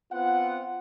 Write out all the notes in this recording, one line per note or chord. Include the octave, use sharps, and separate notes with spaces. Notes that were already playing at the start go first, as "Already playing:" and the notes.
B3 C4 F4 F#5